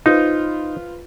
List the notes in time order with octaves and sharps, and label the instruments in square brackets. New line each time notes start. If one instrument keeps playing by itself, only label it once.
[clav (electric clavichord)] D#4 [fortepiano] F4 B4 C5